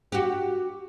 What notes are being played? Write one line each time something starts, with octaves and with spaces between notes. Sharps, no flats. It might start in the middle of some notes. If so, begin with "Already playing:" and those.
F#4 G4